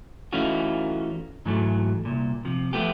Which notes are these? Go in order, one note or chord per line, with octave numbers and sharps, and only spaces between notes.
E3 A3 C#4 D#4 F4 F#4
G#2 E3 F#3 A3
C2 A#2
C3 F3
F3 A3 B3 G4